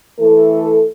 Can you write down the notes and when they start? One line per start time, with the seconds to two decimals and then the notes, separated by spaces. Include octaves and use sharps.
0.20 E3 A3 A4